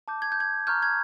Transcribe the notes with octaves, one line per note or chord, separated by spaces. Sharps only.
A5 D6 G6
G#6
G6
G#6
A#5 C#6 F6 G6
G#6